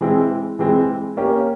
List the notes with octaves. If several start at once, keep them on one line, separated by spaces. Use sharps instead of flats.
E3 G#3 C4 E4
E3 G#3 C4 E4
A#3 C#4 G4